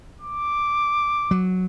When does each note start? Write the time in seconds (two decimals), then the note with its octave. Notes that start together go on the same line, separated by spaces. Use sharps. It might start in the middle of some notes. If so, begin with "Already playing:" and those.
0.21 D6
1.31 F#3